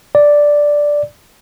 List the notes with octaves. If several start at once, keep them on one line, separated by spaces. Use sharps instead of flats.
D5